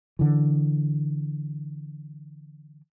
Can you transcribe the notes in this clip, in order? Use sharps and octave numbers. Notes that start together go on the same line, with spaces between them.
D3 E3